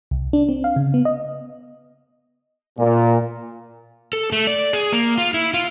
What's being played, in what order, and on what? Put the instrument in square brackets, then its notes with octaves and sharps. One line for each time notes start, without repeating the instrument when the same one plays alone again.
[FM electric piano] C2
D4
C4
F5
C#3
B3
D#5
[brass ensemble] A#2
[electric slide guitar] A4
A3
D5
G#4
A#3
F4
E4
F4